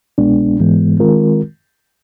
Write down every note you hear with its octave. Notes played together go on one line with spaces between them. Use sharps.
C2 B2 G#3 B3 D4
G#2 E3 G#3 B3
D#3 G#3 C4 F4 A#4